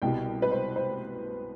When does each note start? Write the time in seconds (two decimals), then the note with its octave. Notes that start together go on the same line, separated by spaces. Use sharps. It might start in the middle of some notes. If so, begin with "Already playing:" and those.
0.02 C2 B2 G3 G5
0.42 B4
0.51 C5
0.76 C5